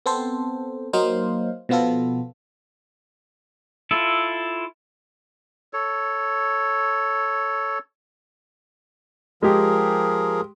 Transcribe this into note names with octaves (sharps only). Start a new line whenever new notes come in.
B3 C4 A4 C5
F#3 A#3 D#4 C5 F5
B2 F3 B3 F4 A4
E4 F4 A4
A4 C#5
F3 G#3 G4 G#4 A#4